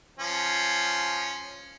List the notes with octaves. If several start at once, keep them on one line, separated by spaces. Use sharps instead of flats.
F3 C#4